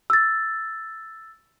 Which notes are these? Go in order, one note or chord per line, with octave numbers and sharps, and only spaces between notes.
E6 A6